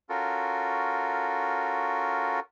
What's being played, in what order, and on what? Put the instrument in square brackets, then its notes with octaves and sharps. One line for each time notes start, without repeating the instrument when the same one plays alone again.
[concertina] C#4 F4 F#4 A4 A#4